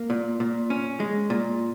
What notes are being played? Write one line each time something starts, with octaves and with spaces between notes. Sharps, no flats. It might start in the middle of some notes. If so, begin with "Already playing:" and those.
Already playing: A#3
A#2
A#2
C#4
G#3
A#2